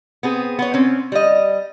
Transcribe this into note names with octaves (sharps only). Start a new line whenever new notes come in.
B3 C4 G#4
B3 C#5
C4 C#4
G3 D#5